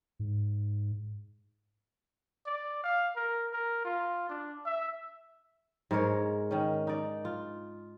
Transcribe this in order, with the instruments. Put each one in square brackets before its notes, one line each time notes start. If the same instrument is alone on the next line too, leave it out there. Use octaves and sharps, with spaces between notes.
[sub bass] G#2
[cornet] D5
F5
A#4
A#4
F4
D4
E5
[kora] G#2 G#3 A#4 C#5
D#3 C#4
D#4 D5
F4